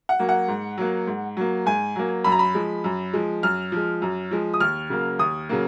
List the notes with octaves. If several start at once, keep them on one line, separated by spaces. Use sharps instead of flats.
F#5
F#3 A#3
F#5
G#2
F#3 A#3
G#2
F#3 A#3
G#2 G#5
F#3 A#3
F#2 B5
A#5
B5
F3 G#3
F#2
F3 G#3
F#2 F6
F3 G#3
F#2
F3 G#3
D#6
D#2 F6
C#3 F#3 A#3
D#2 D#6
C#3 F#3 A#3